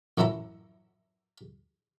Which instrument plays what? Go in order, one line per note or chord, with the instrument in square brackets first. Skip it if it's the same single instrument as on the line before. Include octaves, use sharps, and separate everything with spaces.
[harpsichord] A1 F#2 F#3 E4 A4 A#5